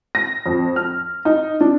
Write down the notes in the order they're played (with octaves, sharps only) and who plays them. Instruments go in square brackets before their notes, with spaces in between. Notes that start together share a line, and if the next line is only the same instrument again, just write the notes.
[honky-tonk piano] A#6
F2
F6
D#4
D4